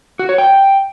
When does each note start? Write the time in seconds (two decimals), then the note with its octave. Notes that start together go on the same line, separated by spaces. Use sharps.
0.19 F#4
0.29 C#5
0.38 G5